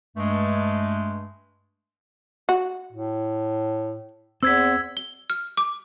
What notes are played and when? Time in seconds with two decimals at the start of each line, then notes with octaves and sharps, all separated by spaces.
0.17 G2 G#3 A3
2.49 F#4
2.92 A2
4.43 E2 C4 C5 E6 G#6 B6
4.97 G7
5.30 F6
5.57 D6